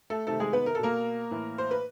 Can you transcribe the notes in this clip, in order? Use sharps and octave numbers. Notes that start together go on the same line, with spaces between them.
A3 A4
C3 D#3 A3 A4
G#3 G#4
B3 B4
A#4
A4
B2 A#3 A#4
A2 E3
C5
B4